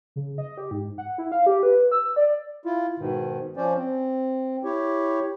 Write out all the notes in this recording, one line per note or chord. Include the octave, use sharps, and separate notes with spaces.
C#3
D#5
G4
G#2
F#5
E4
F5
G4
B4
E6
D5
E4 F4
G#2 B2 D#3
F3 C#4 C5 D5
C4
E4 G4 C#5